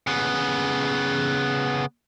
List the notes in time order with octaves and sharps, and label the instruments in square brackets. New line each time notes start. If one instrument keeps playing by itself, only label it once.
[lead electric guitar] C#3 B3